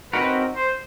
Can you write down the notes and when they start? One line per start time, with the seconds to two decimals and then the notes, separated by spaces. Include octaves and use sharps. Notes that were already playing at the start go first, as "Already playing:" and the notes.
0.13 C4 D#4 F#4 A#4 B4
0.55 C5